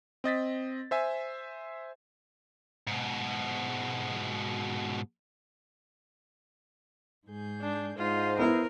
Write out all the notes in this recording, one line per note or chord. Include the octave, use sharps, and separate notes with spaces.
C4 D#5 A6 B6
C5 E5 G#5
G#2 B2
G#2 G#4 G6
D4
G#2 F4 C5 D#5
B3 E4 A#4